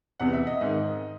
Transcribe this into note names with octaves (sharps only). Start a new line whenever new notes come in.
E2 C3 E3 F#5
E5
D#5
G#2 D#3